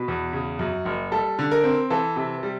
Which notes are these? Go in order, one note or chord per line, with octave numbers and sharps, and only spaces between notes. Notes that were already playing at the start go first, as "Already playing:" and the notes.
Already playing: B2 B4
E2
C#3
F#2
F#1
G3 A4
D3
A#4
C4
E3 A4
C3
G3